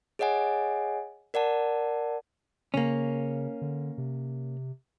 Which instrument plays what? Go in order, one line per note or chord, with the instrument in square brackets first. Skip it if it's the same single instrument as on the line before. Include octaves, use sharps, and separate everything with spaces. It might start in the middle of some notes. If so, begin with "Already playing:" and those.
[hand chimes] G#4 C#5 D#5 F#5 G#5
A#4 D5 F#5 A5
[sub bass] C#3 [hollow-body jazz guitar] A#3 C#4
[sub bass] D3
C3